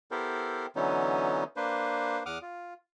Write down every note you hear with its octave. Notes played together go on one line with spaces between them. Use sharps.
B3 E4 G4 A4 A#4 C5
D3 E3 F#3 B3 C#4 D#4
A#3 D4 B4 C5
E2 F#5 D6 D#6 F6
F4